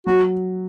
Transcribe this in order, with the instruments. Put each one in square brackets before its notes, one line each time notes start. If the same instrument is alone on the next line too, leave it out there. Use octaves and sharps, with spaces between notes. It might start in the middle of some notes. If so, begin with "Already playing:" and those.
[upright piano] F#3 [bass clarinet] F#4